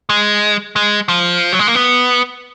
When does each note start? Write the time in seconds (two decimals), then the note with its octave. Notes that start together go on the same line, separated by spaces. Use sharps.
0.09 G#3
0.76 G#3
1.08 F3
1.53 F#3
1.59 G#3
1.67 A#3
1.75 B3